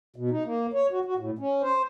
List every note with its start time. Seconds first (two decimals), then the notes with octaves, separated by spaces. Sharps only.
0.16 B2
0.30 D#4
0.45 A#3
0.73 C#5
0.91 F#4
1.05 F#4
1.18 A2
1.39 C#4
1.62 C5